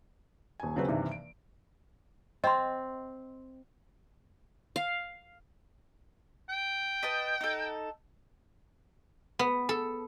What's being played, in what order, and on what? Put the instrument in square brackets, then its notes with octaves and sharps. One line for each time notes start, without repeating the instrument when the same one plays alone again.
[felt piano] D#1 G#5
C#3 F#3 C4 B4
G2 C3 D#3 E3
D7
[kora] C4 [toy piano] D#5 C6
[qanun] F5
[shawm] G5
[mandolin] B4 D#5 A5
D#4 A4
[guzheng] B3
A4